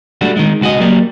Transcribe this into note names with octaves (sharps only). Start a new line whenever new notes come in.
G3 A3 D4 F#4
D#3 G#3
C#2 B3 F#4 G#4 D#5
F#3 G3 A#3